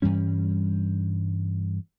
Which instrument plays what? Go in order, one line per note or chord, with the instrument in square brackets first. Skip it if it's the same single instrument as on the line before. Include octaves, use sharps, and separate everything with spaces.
[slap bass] G2 E3 G3 C#4